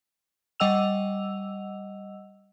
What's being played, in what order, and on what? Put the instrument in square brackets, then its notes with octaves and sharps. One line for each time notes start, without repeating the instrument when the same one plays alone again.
[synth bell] G3 D#5 F#5 E6 F7